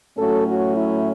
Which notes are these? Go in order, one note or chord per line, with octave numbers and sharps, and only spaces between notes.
A2 F#3 A3 C#4 F#4 A4
F#4
E4